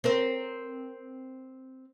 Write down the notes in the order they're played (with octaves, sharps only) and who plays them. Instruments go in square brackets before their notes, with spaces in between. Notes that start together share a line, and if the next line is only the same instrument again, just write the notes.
[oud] C4 A#4 C5